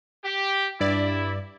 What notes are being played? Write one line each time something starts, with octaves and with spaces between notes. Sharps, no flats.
G4
G2 E4 D5